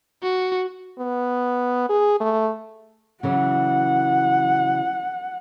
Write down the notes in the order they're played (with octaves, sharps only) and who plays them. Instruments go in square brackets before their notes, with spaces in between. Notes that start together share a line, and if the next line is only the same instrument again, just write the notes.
[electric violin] F#4
[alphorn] B3
G#4
A3
[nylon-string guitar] C#3 E3 F#3 [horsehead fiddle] F#5